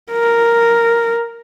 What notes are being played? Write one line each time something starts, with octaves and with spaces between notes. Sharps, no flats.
A#4